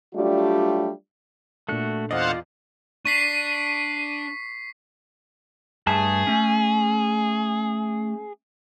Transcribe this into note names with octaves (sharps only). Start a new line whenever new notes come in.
F#3 G3 A3 D4 F4 G4
A#2 A3 D4 F#4 A4 F#6
E2 F4 C5 D5 D#5 F5 F#5
D4 C#6 B6 C7 D#7
G2 A3 G#4 A5
A3 C#4